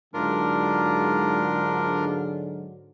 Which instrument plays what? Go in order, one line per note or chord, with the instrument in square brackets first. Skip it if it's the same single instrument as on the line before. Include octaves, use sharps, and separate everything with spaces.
[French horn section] G#2 D3 F#3 [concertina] D4 F4 A#4